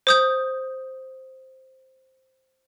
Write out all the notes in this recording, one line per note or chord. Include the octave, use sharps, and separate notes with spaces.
C5 D#6 G6